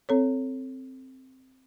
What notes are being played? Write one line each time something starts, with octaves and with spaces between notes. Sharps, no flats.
C4 A4 C#5